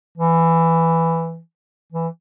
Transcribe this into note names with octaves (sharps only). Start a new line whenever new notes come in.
E3
E3